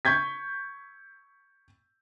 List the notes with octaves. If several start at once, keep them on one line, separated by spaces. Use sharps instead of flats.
C#6 G6 G#6 B6